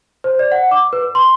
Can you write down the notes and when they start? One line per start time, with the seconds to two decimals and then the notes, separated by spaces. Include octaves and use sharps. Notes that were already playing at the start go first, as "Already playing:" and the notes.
0.24 C5
0.39 D5
0.52 F#5
0.71 D6
0.93 B4
1.15 C6